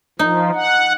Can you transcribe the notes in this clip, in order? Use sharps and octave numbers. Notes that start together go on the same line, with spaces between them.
F3 D#4
F#5